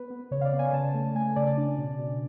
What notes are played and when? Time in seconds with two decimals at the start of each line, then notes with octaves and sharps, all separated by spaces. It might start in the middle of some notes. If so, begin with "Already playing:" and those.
Already playing: B3 B4
0.10 B3
0.31 C#3 C#5
0.41 F5
0.45 D5
0.53 B3
0.59 G#5
0.73 C#3 A5
0.94 A3
1.15 A3 G#5
1.36 C#3 D5
1.47 D5
1.57 D4
1.78 B2
1.99 B2